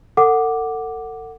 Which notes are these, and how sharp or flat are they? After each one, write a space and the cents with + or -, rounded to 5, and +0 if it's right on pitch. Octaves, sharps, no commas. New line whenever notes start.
A4 +40 F#5 +0 D6 +0